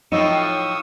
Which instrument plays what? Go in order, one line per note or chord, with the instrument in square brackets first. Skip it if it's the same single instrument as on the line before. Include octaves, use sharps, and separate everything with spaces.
[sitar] A2 F3 F#3 [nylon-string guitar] D#4 [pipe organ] C#6 D#6 E6